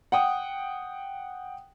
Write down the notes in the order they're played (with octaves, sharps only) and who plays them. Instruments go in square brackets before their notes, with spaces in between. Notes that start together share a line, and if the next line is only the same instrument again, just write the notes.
[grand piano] F#5 G5 D#6